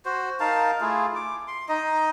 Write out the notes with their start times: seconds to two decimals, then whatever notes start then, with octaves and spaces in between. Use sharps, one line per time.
0.05 F#4 C5
0.40 D#4 A#4 F5 A5
0.81 A3 E4 F4 G#4
1.16 D6
1.48 C6
1.69 D#4 D#5